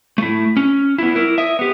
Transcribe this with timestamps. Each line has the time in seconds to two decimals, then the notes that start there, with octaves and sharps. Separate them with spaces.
0.18 A3 E4
0.57 C#4
0.98 B3 E4
1.16 E4 A#4
1.38 D#5 E5
1.59 B3 G4